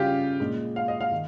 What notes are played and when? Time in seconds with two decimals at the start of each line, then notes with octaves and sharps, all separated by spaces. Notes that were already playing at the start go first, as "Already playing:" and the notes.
Already playing: C#3 G3 C#4 F4 G4
0.40 A#2 G#3 D#4
0.76 F5
0.88 D#5
1.01 F5
1.12 D#3